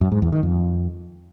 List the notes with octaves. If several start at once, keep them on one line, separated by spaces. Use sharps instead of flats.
F#2
G#2
E2
D#3
F2